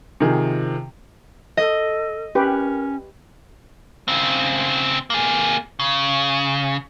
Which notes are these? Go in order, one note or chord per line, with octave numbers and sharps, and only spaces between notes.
C3 D#3 F3 G#4
A4 D#5
C#4 G4 A#4 B4
C#3 C4
A#3 G#4
C#3